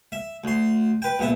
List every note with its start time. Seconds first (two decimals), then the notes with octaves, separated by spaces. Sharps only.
0.12 E5
0.44 D2 C6
1.02 B4 G5
1.19 A#1 B3 E5